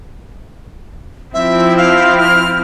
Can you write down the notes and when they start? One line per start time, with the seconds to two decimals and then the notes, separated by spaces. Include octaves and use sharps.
1.34 F3 C4 E4 E5
1.78 F5
2.18 F6